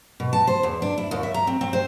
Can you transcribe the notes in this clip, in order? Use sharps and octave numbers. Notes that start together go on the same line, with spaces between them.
B2
A5
C5
E2
D4
E4
D#2
E5
A#5
C4
C4
C5